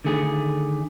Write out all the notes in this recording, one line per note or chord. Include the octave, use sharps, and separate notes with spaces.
D3 D#3 A3 G#4